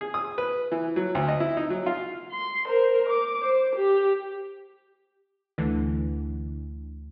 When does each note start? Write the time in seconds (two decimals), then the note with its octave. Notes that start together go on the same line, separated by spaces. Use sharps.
0.01 G#4
0.14 D#6
0.38 B4
0.72 E3
0.96 F#3
1.15 D2
1.28 D#5
1.40 E4
1.57 D#4
1.70 F#3
1.86 F4
2.31 C6
2.67 A#4 C5
3.09 D6
3.41 C5
3.75 G4
5.58 D2 D3 E3 A3